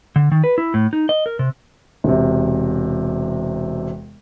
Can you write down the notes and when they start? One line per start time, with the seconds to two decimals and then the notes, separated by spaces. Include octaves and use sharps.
0.16 D3
0.32 D#3
0.44 B4
0.58 E4
0.74 A2
0.93 D#4
1.09 D#5
1.26 A#4
1.39 C3
2.04 E1 C3